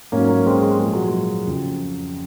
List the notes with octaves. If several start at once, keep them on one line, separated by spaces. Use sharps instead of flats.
G#2 F#3 A#3 C#4
A#3 C#4
G#3 C4
G#3
A#2 F3 G#3
F#3
G#3
F2 C#3 F#3